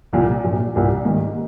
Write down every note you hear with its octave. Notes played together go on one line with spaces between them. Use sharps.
C2 A#2 F3
A#1 A#2 F#3
C2 A#2 G3 A#3
G#2 D#3 G3 A#3